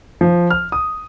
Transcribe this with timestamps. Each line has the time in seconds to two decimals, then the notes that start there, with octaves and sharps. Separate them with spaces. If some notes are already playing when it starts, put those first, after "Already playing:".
0.21 F3
0.50 F6
0.72 D#6